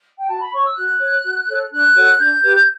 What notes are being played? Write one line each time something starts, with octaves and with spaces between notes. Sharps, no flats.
G5
F#4 A5
B5
C#5 C#6
E6
F#4 F#6
C#5
F#4
A4 C#5
D4 F#6
F#4 A4 C#5
D4 G6
G4 B4